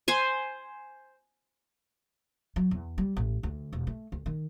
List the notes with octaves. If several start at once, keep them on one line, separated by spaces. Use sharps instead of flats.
C5 G#5
F#3
E2
G3
A1
D2
E1
A3
D2
D#3